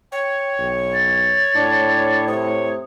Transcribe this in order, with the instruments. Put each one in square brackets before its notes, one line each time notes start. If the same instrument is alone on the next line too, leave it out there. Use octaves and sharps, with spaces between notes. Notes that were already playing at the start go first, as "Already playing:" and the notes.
[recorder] C#5 [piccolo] G5
[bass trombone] B1
[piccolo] A6
[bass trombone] A2 [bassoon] D4
[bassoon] C3 [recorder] C#5 [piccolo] D#6